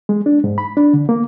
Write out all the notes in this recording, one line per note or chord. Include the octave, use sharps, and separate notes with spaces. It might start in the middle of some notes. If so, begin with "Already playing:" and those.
G#3
D4
G#2
B5
D4
D3
A#3